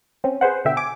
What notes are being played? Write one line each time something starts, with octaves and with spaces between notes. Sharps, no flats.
C4 C#4
G#4 B4 C5 F#5
B2 D3 E5 G5
G#5 D6